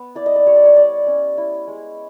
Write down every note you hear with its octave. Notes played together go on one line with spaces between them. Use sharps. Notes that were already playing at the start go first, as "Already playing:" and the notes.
Already playing: B3
E4 D5
D#5
D5
G3 C#5
D5
C#5
G3 D5
C#4
E4
G#3